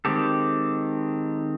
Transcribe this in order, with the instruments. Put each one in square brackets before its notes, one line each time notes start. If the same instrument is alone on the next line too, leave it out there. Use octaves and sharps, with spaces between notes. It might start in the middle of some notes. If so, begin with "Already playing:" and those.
[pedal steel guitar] D#3 G#3 C4 G4 A4